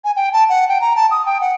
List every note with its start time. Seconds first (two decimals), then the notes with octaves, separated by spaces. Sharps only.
0.04 G#5
0.16 G5
0.33 A5
0.49 F#5
0.69 G5
0.81 A#5
0.96 A5
1.11 D#6
1.26 G5
1.41 F#5